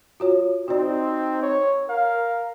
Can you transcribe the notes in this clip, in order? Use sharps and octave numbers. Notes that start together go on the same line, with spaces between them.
F4 F#4 C#5
C4 D#4 F#4 D5
C#5
A#4 F5